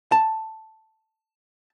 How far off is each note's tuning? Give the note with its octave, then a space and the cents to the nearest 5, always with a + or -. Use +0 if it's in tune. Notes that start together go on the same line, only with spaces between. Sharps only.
A5 +5